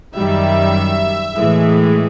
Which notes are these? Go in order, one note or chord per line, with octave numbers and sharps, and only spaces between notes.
F#2 D#3 G3 E5
A2 E3 G#3